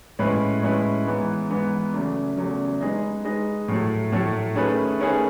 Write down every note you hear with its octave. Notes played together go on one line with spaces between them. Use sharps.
A2 G#3 C#4 E4 B4
A2 G#3 C#4 E4 B4
G#2 E3 B3
G#2 E3 B3
E2 C#3 F#3 A3
E2 C#3 F#3 A3
G#3 D#4 G#4 B4 D#5
G#3 D#4 G#4 B4 D#5
A2 F#3 A3 E4
A2 F#3 A3 E4
D#3 A3 C#4 G#4 B4
D#3 A3 C#4 G#4 B4